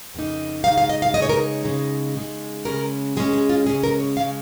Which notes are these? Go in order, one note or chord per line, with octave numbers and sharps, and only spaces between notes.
F2 C#3 A#3 D#4
C#3 G#3 D#4 F5
F5
D#5
F5
C#3 G#3 D#4 D#5
C#5
A#4
C#5
C#3 G#3 D#4
C#3 G#3 D#4
C#3 G#3 C#4 A#4
C#3 G#3 C#4 G#4
G#4
F4
C#3 G#3 C#4 G#4
A#4
C#5
C#3 G#3 C#4 F5